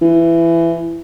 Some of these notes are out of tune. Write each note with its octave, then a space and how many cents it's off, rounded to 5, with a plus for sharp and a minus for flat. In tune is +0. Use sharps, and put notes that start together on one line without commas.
E3 +20